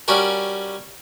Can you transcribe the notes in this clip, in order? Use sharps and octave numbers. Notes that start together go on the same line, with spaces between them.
G3 C#4 F#4 A#4